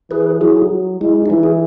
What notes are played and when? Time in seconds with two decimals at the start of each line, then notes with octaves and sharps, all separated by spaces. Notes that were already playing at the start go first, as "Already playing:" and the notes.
0.11 E3 G#4 B4
0.40 F#3 E4 G#4
0.71 F#3
1.01 G#3 E4
1.26 D#4
1.30 E3 E4
1.43 G#4